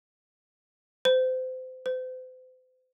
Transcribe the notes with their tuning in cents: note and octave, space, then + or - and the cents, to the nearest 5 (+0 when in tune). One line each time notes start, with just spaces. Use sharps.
C5 -30
C5 -40